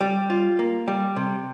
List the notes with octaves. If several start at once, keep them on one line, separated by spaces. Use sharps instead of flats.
G3
F4
A#3
G3
C3